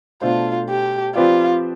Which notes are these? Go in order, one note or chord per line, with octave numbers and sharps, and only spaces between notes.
B2 A3 D4 F4 A4 C5
G4
F3 C4 F4 G4 B4 D5